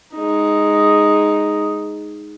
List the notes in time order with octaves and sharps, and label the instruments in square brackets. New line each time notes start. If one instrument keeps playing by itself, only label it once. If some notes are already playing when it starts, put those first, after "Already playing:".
[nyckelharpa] G#3 D#4